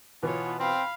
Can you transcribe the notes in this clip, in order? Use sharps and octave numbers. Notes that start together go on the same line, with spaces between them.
B2 E3 B3 F4 C#5
C4 F5 B5